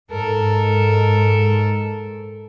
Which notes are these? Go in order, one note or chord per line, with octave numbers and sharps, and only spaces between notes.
G#2 A4 A#4